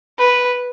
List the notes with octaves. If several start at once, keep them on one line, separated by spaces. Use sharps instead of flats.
B4